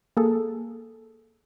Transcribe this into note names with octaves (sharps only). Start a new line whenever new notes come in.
A#3 G#4 A4